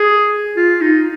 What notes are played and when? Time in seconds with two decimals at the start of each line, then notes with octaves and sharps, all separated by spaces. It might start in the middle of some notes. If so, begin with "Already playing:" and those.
Already playing: G#4
0.57 F4
0.81 D#4